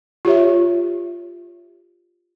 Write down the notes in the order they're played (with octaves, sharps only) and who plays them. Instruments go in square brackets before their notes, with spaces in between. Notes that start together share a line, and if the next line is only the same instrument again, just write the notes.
[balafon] F4 G4 C#5 E5